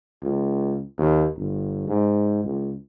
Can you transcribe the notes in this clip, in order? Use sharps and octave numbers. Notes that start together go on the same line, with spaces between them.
C#2
D#2
G1
G#2
C#2